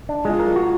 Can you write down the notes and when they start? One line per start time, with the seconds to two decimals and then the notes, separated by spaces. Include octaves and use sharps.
0.09 D4
0.25 G#3 F4
0.40 A#4
0.56 F#4